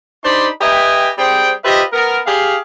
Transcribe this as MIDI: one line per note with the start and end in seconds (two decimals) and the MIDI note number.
0.24 0.48 62
0.24 0.48 63
0.24 0.48 67
0.24 0.48 72
0.24 0.48 83
0.24 0.48 84
0.61 1.09 67
0.61 1.09 71
0.61 1.09 75
0.61 1.09 76
0.61 1.09 79
0.61 1.09 80
1.18 1.52 55
1.18 1.52 60
1.18 1.52 68
1.18 1.52 72
1.18 1.52 79
1.64 1.83 65
1.64 1.83 67
1.64 1.83 71
1.64 1.83 72
1.64 1.83 75
1.64 1.83 76
1.93 2.20 59
1.93 2.20 70
2.26 2.57 67
2.26 2.57 68
2.26 2.57 77